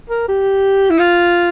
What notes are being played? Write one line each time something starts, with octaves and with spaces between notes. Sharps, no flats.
A#4
G4
E4
F4